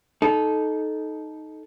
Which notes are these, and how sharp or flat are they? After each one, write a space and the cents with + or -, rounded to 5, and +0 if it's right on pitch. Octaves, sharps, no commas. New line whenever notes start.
D#4 +0 A4 -20